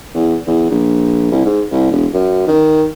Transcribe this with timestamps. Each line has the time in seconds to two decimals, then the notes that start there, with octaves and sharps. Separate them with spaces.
0.14 E2
0.47 E2
0.70 A#1
1.31 C2
1.45 G#2
1.71 C2
1.91 E1
2.14 F#2
2.48 D#3